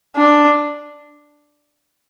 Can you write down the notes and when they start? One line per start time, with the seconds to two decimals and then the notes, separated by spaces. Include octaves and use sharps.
0.16 D4